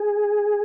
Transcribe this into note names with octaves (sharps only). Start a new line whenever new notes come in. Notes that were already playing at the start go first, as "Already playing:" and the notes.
Already playing: G#4